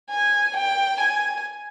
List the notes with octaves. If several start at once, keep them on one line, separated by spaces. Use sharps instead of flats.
G#5
G5
G#5